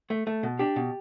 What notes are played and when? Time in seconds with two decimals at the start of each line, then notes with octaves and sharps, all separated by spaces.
0.10 A3
0.27 A3
0.43 B2
0.59 D4 G4
0.76 B2